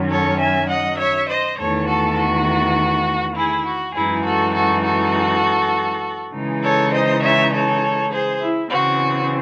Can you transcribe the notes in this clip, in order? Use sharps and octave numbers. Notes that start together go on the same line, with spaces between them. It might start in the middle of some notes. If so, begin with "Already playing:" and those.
Already playing: F#2 D#3 F#3 C#4
A4 C#5
E5 G#5
D#5 F#5
C#5 E5
C5 D#5
E2 D#3 A3 A4 C#5
F#4 A4
F#4
E4 G#4
F#4
F#2 E3 G#3 D#4 E4 G#4
F#4 A4
F#4 A4
F#4 A4
C#3 E3 G#3 D#4
A4 C#5
C5 D#5
C#5 E5
A4 C#5
G#4 C5
E4
C#3 E3 C4 F#4